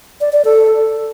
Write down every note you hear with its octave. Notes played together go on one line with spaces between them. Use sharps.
D5
D5
A4